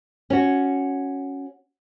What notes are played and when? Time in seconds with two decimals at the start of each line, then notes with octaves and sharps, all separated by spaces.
0.30 C#4 F#4